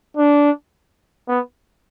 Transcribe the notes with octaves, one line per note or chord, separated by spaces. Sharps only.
D4
B3